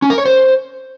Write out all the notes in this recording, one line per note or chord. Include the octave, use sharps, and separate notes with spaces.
C#4
A#4
C#5
C5